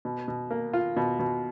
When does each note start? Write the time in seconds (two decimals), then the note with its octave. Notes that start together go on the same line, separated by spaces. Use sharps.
0.05 B2
0.28 B2
0.51 A#3
0.74 F4
0.97 B2
1.20 B2